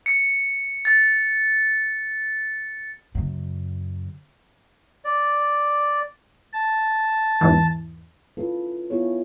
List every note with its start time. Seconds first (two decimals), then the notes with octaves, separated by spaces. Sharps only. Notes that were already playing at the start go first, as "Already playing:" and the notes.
0.06 C#7
0.85 A6
3.15 F#2 C#3
5.04 D5
6.53 A5
7.41 E2 G#2 E3
8.37 C#4 E4 F4 A4 B4
8.90 B3 E4 F4 G#4 C#5